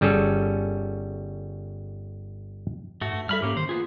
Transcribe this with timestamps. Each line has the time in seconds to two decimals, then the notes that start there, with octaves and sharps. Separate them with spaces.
0.01 G1 G3 C#4 G#4 A4
3.02 G#2 A3 F#4
3.13 G2
3.29 G3 A4 E5 B5 F6
3.42 G#2 A#3 C#4 G4
3.57 D#3 C5
3.69 A#3 B3 F4 G#4